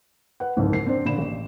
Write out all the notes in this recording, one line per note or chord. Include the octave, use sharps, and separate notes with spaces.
B4 F#5
F#1 C2 F2 G#2
C7
C4 D4 C5
A#2 D3 B5 E7
A1